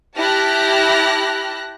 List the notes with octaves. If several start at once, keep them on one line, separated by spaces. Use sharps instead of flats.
E4 G4 A5 F6 F#6 A#6